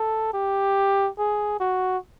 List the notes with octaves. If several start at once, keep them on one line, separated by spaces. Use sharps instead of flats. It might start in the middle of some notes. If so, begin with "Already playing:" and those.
Already playing: A4
G4
G#4
F#4